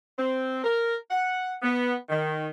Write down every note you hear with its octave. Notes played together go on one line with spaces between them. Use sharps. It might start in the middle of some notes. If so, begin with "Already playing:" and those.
C4
A#4
F#5
B3
D#3